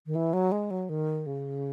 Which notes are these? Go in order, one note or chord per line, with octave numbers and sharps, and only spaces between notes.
D#3
E3
F#3
G#3
F#3
D#3
C#3